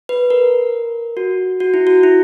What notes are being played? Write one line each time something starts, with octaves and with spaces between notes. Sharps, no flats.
B4
A#4
F#4
F#4
E4
F#4
E4